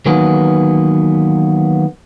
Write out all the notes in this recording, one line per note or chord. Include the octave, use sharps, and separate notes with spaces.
D#3 E3 F#3 A#3 B3 G#4